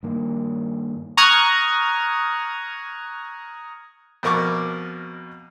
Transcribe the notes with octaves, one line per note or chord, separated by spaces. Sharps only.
G2 D#3 A#3
A#5 C#6 D#6 F6 F#6 G#6
F2 B2 A#4 C#6 D6